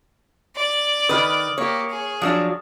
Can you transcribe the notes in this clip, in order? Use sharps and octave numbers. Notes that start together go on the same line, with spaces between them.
D5
D#3 B4 D#6 F6
A#3 G4 C#5
G#4
F3 F#3 D4